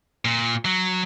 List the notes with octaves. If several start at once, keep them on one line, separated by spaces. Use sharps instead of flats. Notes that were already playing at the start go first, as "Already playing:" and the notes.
A#2
F#3